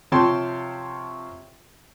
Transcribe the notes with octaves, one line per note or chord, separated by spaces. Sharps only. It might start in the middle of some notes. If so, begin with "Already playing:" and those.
C3 F3 C#5 G5 A5 C6